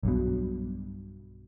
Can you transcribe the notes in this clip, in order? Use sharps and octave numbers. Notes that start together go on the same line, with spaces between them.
B1 G2 B2